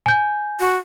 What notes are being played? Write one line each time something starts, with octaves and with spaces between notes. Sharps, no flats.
G#5 G6
F#4